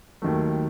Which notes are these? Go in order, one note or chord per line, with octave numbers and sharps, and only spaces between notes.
D#2 D#3 F#3 A3